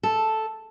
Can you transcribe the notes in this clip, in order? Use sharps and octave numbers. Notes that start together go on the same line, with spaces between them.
A4